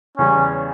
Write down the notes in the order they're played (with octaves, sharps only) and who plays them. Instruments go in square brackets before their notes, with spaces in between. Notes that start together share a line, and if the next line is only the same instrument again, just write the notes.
[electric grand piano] E2 C#3 G3 [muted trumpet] C#4